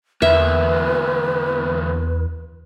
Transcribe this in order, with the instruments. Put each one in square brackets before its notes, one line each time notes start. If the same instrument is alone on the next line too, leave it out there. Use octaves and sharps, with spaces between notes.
[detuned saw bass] E2 [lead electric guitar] D3 A#3 [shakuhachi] B4 [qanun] E5